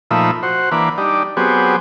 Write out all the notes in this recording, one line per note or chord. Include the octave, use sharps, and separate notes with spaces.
A#2 F3 A3 D#4 E5 B5
F#4 C5
E3 A#3 D4 B5
G3 D4 D#4
F#3 B3 C4 G4 G#4